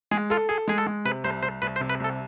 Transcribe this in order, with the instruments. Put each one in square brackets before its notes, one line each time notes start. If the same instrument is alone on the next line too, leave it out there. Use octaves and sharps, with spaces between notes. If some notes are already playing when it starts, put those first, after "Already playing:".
[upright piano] G#3 [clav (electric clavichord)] G#4
[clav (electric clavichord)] F4 [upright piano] A4
[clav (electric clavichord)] G#4 [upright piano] A4
[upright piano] G#3 [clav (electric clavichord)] G#4
[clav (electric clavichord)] A4
[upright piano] G#3
[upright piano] C3 [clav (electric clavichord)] B4
[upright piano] C2 [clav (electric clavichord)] C5
[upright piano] C2 [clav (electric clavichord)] C5
[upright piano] C2 [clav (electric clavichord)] B4
[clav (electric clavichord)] C5
[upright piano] C3
[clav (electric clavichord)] B4
[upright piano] C2 [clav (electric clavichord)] A4